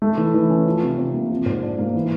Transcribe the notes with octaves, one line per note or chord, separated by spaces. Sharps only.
A3
E3
E3
C#4
F3
C3
C3
A#3
F3
G#2
D4
A#3
E3